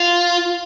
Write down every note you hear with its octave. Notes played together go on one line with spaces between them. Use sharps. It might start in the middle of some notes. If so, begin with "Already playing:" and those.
Already playing: F4